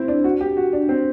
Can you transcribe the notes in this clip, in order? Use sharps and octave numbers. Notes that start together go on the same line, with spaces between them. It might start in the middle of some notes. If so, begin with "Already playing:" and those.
Already playing: C4 E4
D4
F#4
G4
F#4
D4
C4